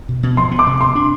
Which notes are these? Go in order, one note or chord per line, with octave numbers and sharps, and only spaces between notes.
B2
B2
F3 C6
B3
D6
C3
C3 C6
D4